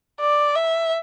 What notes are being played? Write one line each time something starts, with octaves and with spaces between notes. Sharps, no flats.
D5
E5